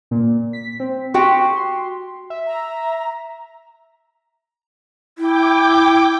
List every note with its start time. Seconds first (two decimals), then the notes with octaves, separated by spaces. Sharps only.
0.11 A#2
0.53 B6
0.80 C4
1.14 F#4 G4 G5 C6
1.56 C6
2.30 E5
2.47 A#5
5.18 E4 G5 D6